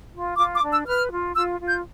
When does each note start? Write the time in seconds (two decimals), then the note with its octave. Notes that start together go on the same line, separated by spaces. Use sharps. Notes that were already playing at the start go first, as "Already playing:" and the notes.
0.14 F4
0.38 F4 D6
0.55 D6
0.63 D4
0.70 E6
0.87 B4 F6
1.12 F4
1.36 F4 E6
1.61 F4
1.68 G6